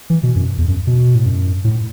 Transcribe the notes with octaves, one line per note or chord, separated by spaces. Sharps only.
E3
B2
F#2
E2
F#2
B2
A2
F#2
A2